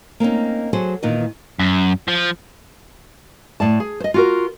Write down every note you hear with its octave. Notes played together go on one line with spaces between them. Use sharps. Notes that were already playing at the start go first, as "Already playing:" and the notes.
A#3 C4 C#4 D#4
F#3 F#4 G#4 A4 C5
E2 A#2 D#3 D#4 B4
F#2
F3
A2 D5 A5
G#4
C5 D#5
F4 F#4 A#4